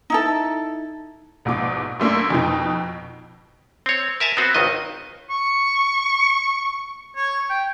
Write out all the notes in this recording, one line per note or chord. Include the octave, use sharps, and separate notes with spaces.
D#4 E4 A4
A#1 G#2 B2 D6
F#2 A3 A#3 D4
F2 B2 D#4
C4 C#5
A#4 E5 G#5 A5
B3 C4 F#4
G#1 C#2 D#3 D#5
C#6
C#5
G5